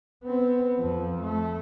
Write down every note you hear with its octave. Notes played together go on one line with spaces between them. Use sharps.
B3 C4
F2 F3
A3